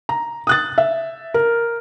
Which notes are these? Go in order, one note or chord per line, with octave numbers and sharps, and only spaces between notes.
A#5
D#6 F#6 A6
E5
A#4